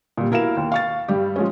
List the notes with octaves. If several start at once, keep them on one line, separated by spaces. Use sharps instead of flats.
A#2 G3
B2 E4 A#4 F5 E7
D#2
F5 C#6 A6
G2 G3 G4
F3 G#3 C#4